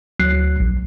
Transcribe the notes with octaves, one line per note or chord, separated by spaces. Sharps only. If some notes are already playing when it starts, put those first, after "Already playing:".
D2 F#3 F#6 C7
A#1